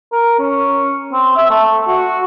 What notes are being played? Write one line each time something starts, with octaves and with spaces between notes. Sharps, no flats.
A#4
C#4
C4
E5
A3
F#4